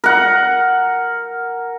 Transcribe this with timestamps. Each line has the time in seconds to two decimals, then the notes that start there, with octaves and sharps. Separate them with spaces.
0.04 A#4 F#5